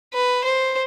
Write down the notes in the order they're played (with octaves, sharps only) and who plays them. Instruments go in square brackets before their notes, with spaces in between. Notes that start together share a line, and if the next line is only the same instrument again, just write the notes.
[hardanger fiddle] B4
C5